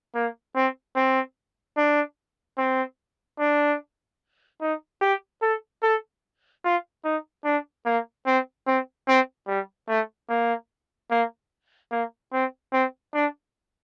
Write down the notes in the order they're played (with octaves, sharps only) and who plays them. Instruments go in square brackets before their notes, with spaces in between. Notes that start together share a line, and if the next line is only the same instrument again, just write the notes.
[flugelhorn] A#3
C4
C4
D4
C4
D4
D#4
G4
A4
A4
F4
D#4
D4
A#3
C4
C4
C4
G3
A3
A#3
A#3
A#3
C4
C4
D4